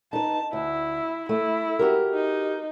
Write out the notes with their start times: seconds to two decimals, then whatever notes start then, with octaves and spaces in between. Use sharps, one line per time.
0.13 D#4 B4 A5
0.53 D2 E4
1.29 A3 E4
1.79 F#4 G4 A#4
2.14 D#4